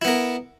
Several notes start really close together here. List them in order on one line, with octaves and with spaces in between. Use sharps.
E4 B3 A#4